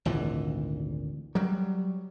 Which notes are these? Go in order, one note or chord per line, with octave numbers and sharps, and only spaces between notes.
G#1 D2 A#2 E3
F#3 G3